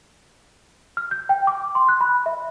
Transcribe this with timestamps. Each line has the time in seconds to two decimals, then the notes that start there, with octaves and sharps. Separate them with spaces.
0.97 F6
1.11 G6
1.29 G5
1.47 D6
1.75 C6
1.89 F#6
2.01 B5
2.26 E5